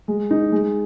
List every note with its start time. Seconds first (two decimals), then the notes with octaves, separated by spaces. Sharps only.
0.08 G#3
0.31 D#4
0.52 G#3